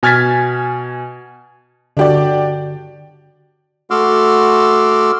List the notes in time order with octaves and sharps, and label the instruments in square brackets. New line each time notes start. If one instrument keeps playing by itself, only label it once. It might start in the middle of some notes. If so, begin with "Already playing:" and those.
[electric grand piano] B2 G#5 F6 G#6 A6 B6
[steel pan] D3 F#4 [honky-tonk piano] D4 G4 D5
[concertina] A3 F#4 C6 D6 E6 F6